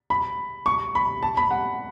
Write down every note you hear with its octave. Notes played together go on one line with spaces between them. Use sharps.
B5
C#6
B5
A5
B5
F#5